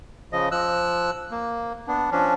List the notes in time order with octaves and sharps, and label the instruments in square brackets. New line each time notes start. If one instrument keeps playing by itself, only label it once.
[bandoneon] C#3 F3 D#5
F3 E6 F#6
A#3
B3 D4
F3 C#4 D4